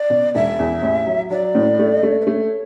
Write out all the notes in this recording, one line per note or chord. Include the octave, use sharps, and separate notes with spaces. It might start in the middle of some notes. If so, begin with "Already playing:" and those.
Already playing: D5
B2
E1 E5
E2
A1
F#3
F#3 D5
A2
A3
A3
B4
A3 C#5